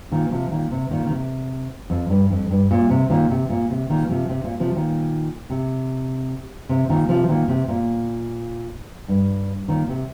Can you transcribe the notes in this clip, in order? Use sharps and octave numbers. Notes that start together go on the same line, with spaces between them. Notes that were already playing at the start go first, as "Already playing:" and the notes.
A#2 D#3
C3 F3
A#2 D#3
C3
A#2 D#3
D#3
C3
F2
G2
F2
G2
A#2
C3
A#2 D#3
C3
A#2
C3
A#2 D#3
C3 F3
C3
A#2
C3 F3
A#2 D#3
C3
C3
A#2 D#3
C3 F3
A#2 D#3
C3
A#2
G2
A#2 D#3
C3